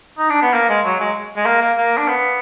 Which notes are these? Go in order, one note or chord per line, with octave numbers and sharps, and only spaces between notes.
D#4
D4
B3
A#3
G#3
F#3
G#3
G#3
A#3
A#3
A#3
D4
B3